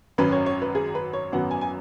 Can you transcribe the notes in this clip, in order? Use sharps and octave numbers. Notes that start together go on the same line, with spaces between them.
G#1 F#2 F#3 C#4 B4
C#5
C#5
B4
G#4
B4
C#5
G#1 F#2 F#3 B3 F#5
G#5
G#5